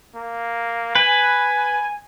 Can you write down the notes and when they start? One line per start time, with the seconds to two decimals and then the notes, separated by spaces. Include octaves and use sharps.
0.15 A#3
0.95 B4 G#5